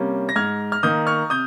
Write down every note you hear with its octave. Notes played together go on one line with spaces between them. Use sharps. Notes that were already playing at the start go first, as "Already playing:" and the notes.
Already playing: C3 G3 A#3 C#4
A#6
G#2 F6 G#6
F6
D#3 A#3 D#6 G6
C#6 F6
C3 D#6 G6